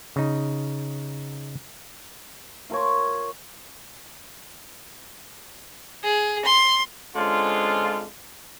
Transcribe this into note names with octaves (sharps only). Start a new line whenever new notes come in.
C#3 D#4
F4 A#4 C#5
G#4
C6
D3 G#3 C4 C#4 F4